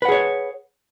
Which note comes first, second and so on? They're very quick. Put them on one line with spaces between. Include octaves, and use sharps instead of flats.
B4 F#5 G#4 C#5